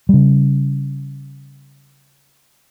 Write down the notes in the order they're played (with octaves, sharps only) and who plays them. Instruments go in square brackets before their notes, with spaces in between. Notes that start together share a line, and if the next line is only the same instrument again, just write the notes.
[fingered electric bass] C#3 G3